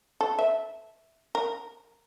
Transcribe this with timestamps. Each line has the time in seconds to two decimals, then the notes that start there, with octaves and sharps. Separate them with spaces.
0.21 A4
0.39 E5
1.35 A#4